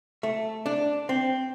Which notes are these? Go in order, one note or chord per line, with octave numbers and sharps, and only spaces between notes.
A3
D4
C4